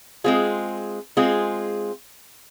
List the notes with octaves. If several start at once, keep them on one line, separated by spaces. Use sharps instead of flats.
G#3 C4 F4 G#4
G#3 C4 F4 G#4